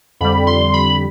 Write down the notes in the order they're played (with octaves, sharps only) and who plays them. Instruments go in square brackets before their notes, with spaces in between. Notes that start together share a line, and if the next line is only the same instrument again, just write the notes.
[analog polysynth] F2 D3 G3 B5
C6
B5